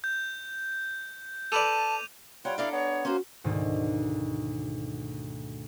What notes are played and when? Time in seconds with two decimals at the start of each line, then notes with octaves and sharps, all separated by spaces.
0.04 G6
1.52 A4 B4 D5 A5 D6 D#7 F7
2.45 G3 F4 C#5 F#5 G5
2.58 D4 E4 A4 A#4 D5 F5
2.72 B3 C#5
3.05 A#3 C#4 F#4 C5
3.44 D2 G#2 B2 D#3